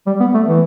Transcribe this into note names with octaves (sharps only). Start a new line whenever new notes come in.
G3
B3
A3
E3